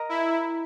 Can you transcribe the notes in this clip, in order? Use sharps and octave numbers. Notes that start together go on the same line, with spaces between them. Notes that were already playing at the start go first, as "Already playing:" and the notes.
Already playing: A#4 D#5 A#5
E4